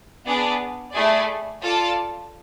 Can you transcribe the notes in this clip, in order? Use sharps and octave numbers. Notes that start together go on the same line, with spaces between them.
B3 D4 G#4 D5
A3 E4 G#4 D5
F4 A4 D5 A5